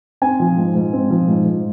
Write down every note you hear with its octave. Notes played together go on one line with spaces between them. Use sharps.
C4 G#5
F3
G#2
G#2
C4
F3
G#2
G#2